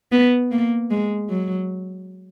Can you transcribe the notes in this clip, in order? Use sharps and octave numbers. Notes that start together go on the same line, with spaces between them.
B3
A#3
G#3
F#3